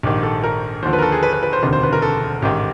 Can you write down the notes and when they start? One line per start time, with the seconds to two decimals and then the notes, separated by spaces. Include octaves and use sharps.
0.03 A#1 G#2 D#3 G4
0.23 A4
0.43 A#4
0.82 D#2 D3 F3 C5
0.93 B4
0.99 A#4
1.02 A4
1.12 G#4
1.23 B4
1.33 B4
1.43 B4
1.53 C5
1.62 E1 D2 C3 D#3
1.73 C5
1.83 B4
1.93 A#4
2.02 A4
2.42 A1 G#2 D#3 G4